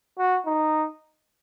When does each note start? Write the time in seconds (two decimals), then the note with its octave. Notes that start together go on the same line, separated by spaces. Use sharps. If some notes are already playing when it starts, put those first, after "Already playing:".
0.18 F#4
0.46 D#4